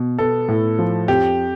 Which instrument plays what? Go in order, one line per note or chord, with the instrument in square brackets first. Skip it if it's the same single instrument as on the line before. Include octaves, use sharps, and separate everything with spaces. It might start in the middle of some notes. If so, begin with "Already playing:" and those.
Already playing: [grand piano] B2
[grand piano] B3 [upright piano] A4
[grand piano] A2
F3
[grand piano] F2 [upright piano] G4